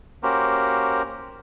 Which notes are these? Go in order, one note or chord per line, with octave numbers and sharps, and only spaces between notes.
A#3 C#4 F#4 G4 A#4 C5